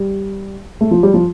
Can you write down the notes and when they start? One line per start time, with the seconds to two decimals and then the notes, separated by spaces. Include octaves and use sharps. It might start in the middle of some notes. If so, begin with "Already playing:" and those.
Already playing: G3
0.81 A3
0.91 F3
1.03 G3
1.14 F3